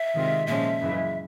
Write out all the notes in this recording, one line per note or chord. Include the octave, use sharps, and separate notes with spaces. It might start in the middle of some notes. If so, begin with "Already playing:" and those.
Already playing: E5
C3 D#3 G#3 C4 F4
A#2 F3 G#3 C#4 E5
F#2 C#3 E3 G#3